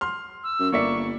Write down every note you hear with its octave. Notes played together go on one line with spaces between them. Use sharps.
C6 F6
E6
F#2
G1 A#3 D5 E5 C#6